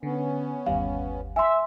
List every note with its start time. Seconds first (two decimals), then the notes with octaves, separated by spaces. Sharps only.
0.03 D3 B3 C#4
0.66 G1 D#2 G3 F5
1.36 E5 G#5 C6